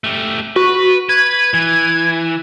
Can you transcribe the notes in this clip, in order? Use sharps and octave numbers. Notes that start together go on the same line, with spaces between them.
A3 G4
F#4 B4
B4 G#6
E3